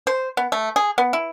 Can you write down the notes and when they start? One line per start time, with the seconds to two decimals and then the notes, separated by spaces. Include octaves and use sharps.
0.07 C5
0.37 B3
0.52 A3
0.76 G#4
0.98 B3
1.13 E4